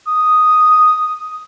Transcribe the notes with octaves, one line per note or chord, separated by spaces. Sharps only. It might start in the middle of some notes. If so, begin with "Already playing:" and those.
D#6